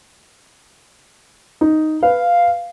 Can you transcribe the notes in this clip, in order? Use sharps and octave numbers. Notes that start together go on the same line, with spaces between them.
D#4
B4 F5